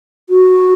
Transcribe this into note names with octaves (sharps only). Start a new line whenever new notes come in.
F#4